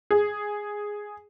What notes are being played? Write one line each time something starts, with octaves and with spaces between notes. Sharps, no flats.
G#4